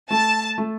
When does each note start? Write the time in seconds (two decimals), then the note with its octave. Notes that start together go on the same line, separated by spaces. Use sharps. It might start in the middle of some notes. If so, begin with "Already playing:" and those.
0.11 A3 A5
0.58 A3